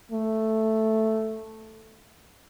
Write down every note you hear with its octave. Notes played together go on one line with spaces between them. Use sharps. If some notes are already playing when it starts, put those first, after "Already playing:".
A3